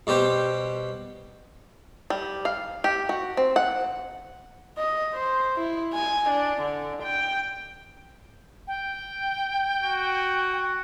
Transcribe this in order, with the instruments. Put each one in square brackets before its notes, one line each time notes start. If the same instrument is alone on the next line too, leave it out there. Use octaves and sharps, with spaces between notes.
[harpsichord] B2 G3 G4 C5
[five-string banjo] G3
F5
G4
F#4
C4
F#5
[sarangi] D#5
C5
E4
G#5
D4
D3
G5
[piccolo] G5
[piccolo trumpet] F#4